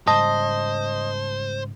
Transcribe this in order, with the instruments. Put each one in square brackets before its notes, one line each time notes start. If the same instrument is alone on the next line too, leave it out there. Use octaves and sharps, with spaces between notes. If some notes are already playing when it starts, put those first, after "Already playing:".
[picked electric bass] G#2 C#3 G3 [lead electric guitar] C5 [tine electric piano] D#5 [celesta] A5